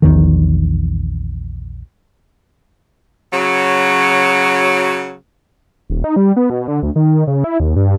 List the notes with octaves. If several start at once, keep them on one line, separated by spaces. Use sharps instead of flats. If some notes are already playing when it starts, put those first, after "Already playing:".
A#1 E2 D#3
C#3 F#3
D#1
D#4
G3
B3
B2
D3
D2
D#3
C#3
E4
D#2
G2